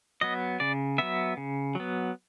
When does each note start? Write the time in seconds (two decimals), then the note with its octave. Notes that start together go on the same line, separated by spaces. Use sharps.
0.21 F#3 B3 D#5
0.60 C#3 D5
0.98 F#3 B3 E5
1.37 C#3
1.75 F#3 B3